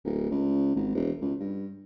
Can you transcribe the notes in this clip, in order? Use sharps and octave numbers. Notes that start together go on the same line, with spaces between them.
D1
C#2
G#1
E1
C#2
G2